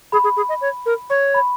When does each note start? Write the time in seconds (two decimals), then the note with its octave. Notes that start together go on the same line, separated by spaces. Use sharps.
0.12 G#4 B5
0.24 G#4
0.37 G#4
0.49 D#5
0.61 C#5
0.86 A#4
1.10 C#5 C#6
1.34 B5